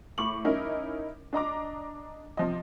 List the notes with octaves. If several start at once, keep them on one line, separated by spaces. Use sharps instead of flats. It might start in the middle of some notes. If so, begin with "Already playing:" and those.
A2 B5 C#6 D6 F#7
C#4 D#4 E4 A#4
D4 D#5 A#5 D6
C3 F3 D#5